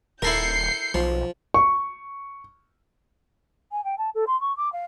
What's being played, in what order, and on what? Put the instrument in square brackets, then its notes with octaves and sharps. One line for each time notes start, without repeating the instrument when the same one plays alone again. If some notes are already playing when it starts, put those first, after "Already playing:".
[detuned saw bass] D#1 [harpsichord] E4 A4 A#4 [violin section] G6 C7 C#7
[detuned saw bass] B1 [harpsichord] F3
[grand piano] C#6
[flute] G#5
G5
A5
A4
C6
C#6
D6
F5